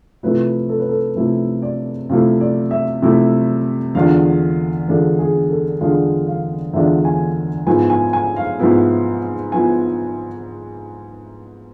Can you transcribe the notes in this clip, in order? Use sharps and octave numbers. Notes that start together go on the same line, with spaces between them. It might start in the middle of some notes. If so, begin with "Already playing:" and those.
C3 F3 A3 E4 B4
A4
B4
A4
C3 F3 A3 E4
D5
C3 F3 A3 E4 F5
D5
E5
C3 F3 A3 E4
E2 D3 G#3 D4 F4 F5
E2 D3 G#3 D4 F4 A4
G#4
A4
E2 D3 G#3 D4 F4 F5
F5
E2 D3 G#3 D4 F4 E5
G#5
G#2 F3 B3 E4 G#5
G#5
G#5
F5
G#2 F3 B3 E4
F3 B3 E4 G#5